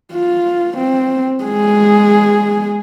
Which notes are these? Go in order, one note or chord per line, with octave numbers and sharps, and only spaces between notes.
F4
C4
G#3 G#4